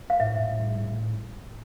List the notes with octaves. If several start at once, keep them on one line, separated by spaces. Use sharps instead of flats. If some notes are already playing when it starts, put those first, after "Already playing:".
F5
A2 E5
A2
G3
A2